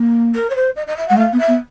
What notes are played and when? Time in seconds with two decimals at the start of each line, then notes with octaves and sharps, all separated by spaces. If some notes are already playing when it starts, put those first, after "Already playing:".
Already playing: A#3
0.34 A#4
0.49 C#5
0.55 C5
0.76 D#5
0.87 D#5
0.96 E5
1.08 G#3 F#5
1.17 A3 F5
1.33 B3
1.38 E5
1.48 B3